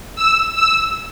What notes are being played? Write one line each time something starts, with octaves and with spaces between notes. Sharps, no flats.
E6
E6